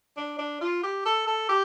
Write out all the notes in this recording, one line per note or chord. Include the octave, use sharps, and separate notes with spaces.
D4
D4
F4
G4
A4
A4
G4